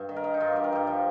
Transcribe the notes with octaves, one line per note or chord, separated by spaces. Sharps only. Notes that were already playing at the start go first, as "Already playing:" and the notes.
Already playing: G2
D#3
A#4
D#3
D#4
G2 F4
G2 G4
A#4
G2 G4
F3